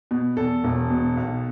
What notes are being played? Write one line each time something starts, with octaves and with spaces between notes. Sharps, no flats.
B2
E2 A4
E1
B2
B1